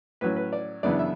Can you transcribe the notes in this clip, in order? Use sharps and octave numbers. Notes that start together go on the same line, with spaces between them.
A2 F#3 C#4 B4
B4
D5
F#2 C#3 E3 B3 D4 D5
E5